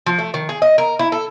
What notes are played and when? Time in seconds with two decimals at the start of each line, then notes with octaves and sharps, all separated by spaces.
0.06 F3
0.19 A3
0.34 D#3
0.49 G#4
0.62 D#5
0.78 A#4
0.99 E4
1.12 A4